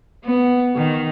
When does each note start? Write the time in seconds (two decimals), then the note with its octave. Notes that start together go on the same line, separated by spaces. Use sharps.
0.25 B3
0.76 D#3